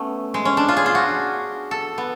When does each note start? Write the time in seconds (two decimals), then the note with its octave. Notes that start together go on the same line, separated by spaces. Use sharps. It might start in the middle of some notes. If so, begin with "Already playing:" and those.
Already playing: A3 B3 C#4
0.34 G#3
0.45 C#4
0.57 D4
0.68 F4
0.77 G#4
0.86 F4
0.95 F#4
1.71 A4
1.98 B3